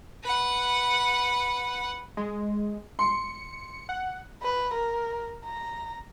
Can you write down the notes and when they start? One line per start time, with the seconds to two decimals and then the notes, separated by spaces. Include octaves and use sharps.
0.23 B4 F#5
2.17 G#3
2.99 C6 C#7
3.89 F#5
4.42 B4
4.74 A#4
5.45 A#5